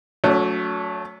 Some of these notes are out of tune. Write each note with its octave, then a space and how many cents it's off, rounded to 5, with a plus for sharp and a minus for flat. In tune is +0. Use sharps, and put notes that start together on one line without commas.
F#3 -20 A3 +0 C#4 +40